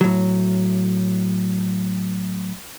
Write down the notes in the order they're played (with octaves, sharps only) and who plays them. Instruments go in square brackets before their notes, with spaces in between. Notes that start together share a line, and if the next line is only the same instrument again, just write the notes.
[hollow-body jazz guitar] A2 F#3